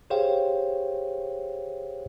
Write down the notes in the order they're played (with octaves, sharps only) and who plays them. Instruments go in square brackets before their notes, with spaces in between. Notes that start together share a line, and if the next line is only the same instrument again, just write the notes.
[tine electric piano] G4 G#4 C5 C#5 F5 G5